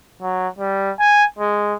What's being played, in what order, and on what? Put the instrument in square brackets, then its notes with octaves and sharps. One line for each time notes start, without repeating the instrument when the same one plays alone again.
[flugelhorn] F#3
G3
G#5
G#3